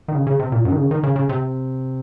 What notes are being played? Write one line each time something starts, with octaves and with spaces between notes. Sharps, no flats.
D#3
C#3
C#3
C3
A#2
F#2
D#3
C#3
D#3
C#3
C#3
C3